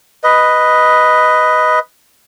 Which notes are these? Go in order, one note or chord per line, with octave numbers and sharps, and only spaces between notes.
B4 D#5